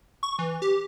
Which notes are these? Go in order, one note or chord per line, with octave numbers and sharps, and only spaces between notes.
C#6
E3
G4